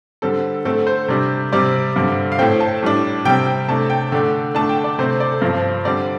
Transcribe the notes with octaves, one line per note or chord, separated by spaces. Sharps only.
D3 G3 C4 A4
D3 A3 C4 A4
C5
C3 G3 D4
C3 G3 C4 D5
G2 D3 G3 C4
F5
A2 A3 C4 G5
A5
A2 G3 D4
C3 G3 C4 G5
G5
C3 A3 D4 A5
G5
D3 A3 D4 G5
D3 A3 D4 A5
G5
D5
C3 A3 C4 C5
D5
A4
G2 F3 C4 C5
D3 G3 C4 D5